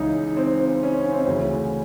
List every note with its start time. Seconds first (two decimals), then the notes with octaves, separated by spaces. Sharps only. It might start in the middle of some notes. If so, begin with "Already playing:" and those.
Already playing: C#2 C#3 E3 D#4
0.37 C4
0.60 C4
0.83 C#4
1.05 C#4
1.13 C4
1.20 C#4
1.27 D2 C#3 E3